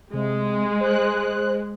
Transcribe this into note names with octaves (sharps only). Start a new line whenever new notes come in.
C3 G#3
C5 F#6